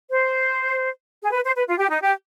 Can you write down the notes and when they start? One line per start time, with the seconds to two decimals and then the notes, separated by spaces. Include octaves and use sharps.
0.09 C5
1.22 G#4
1.33 B4
1.44 C5
1.56 B4
1.68 F4
1.78 G4
1.89 D#4
2.02 G4